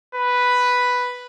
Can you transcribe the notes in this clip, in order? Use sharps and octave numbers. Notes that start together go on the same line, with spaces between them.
B4